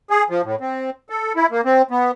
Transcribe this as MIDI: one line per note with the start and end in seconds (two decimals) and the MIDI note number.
0.10 0.23 68
0.30 0.42 53
0.44 0.55 45
0.61 0.90 60
1.10 1.33 69
1.36 1.47 64
1.51 1.61 58
1.65 1.82 60
1.91 2.11 59